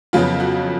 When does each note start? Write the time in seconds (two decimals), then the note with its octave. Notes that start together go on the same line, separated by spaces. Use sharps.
0.13 F2 C#3 F#3 B3 F4
0.40 F#4